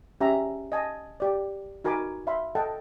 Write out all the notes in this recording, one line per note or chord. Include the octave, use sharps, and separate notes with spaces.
C#4 G4 E5 A#5
D#5 G#5 A5
G4 D5
D#4 F#4 A#4 G#5 B5 D6
E5 F5 B5 C6
A4 D#5 F#5 G5 A5